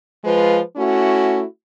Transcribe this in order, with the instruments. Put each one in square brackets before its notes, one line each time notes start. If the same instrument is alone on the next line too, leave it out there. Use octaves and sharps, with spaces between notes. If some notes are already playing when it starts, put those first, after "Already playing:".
[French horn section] F3 G#3 F4 B4
A3 C#4 E4 F#4